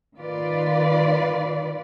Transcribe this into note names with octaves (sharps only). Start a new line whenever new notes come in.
D#3 F4 B4 D5